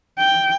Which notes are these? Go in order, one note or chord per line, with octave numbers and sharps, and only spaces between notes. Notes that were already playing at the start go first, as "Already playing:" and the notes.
G5